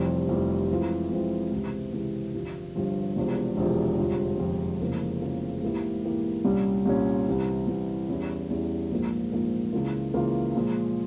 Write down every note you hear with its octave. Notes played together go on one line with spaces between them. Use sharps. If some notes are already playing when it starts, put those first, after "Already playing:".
Already playing: F1 F2 C3 E3 G3
F1 F2 C3 E3 G3
F2 E3 G#3 C4 F4
F2 E3 G#3 C4 F4
C#2 C3 E3
C#2 C3 E3
G1 G2 F3
G1 G2 F3
E1 E2 C3 F3
E1 E2 C3 F3
G1 F2 C3 F3
G1 F2 C3 F3
F1 F2 C#3 E3 A#3
F1 F2 C#3 E3 A#3
G#2 E3 A#3 E4 G4
G#2 E3 A#3 E4 G4
C2 A#2 G3 C#4
C2 A#2 G3 C#4
C2 C3 E3
C2 C3 E3
E2 E3 G3 C#4 E4
E2 E3 G3 C#4 E4
A#1 G#2 F3 A#3
A#1 G#2 F3 A#3
C#2 C#3 E3 A#3 F4
C#2 C#3 E3 A#3 F4
A#2 F3 G#3